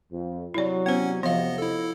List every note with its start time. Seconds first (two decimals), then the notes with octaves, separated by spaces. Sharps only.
0.12 F2
0.54 C3 F#3 E4 D5
0.86 B3 C#4 C5 F#5
1.23 F2 C3 F3 B3 D#5 F5
1.58 E4 A4